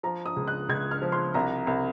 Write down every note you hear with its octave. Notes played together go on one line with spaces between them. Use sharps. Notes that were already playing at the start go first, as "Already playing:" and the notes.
F3 A#5
D#6
C#2
F#6
C#2 G#6
F6
F3
C6
C2 A#5
C2